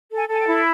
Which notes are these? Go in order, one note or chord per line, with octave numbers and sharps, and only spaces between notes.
A4
G#5
A4 G#5
G5
E4